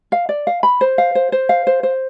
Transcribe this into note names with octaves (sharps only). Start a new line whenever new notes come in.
F5
D5
F5
B5
C5
F5
C5
C5
F5
C5
C5